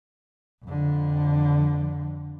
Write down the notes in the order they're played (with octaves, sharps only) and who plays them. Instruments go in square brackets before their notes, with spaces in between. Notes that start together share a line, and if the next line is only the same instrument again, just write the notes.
[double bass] F2 D3